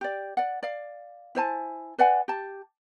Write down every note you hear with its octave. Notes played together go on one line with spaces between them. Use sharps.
G4 D5
D5 F#5
D5 F5
E4 C5 G#5 A5
B4 D5 F#5 G#5
G4 A5